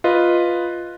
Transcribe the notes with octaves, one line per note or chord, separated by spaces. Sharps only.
F4 B4 D#5